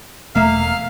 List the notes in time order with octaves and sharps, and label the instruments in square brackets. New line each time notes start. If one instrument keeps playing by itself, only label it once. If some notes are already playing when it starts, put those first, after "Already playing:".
[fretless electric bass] E1 A3 [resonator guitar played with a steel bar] A#3 E5 [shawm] F5